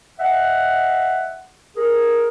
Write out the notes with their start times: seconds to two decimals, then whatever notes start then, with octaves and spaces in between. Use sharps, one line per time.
0.20 D#5 E5 F#5
1.77 G#4 A#4